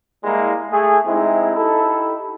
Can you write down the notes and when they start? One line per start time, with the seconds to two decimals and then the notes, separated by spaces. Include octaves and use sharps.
0.24 G3 G#3 A#3 E4
0.72 A3 G#4
1.06 C3 G#3 C4 D#4 E4
1.56 D#4 E4 G4 A4